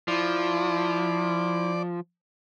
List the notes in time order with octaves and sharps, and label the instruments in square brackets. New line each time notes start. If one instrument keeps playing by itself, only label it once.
[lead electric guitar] F3 [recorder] E4 [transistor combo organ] D5